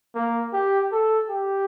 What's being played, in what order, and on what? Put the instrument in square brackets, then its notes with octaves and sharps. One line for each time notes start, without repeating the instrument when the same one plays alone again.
[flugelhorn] A#3
G4
A4
G4